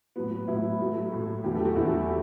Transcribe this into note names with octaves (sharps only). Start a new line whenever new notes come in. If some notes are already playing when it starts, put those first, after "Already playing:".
A2 F#3 B3
A2 F#3 B3 E4
A2 F#3 A3
A2 F#3 A3
E2 D3 F#3 A3 G4
A4
G4
F#4
E2 D3 F#3 A3 E4